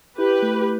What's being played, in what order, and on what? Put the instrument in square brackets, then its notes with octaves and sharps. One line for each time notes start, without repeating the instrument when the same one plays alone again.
[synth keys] E4 [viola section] G4 B4
[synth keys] A3